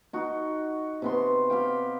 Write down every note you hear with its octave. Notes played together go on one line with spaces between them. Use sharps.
D#4 F#4
C3 B3 C6
G4 F5 G5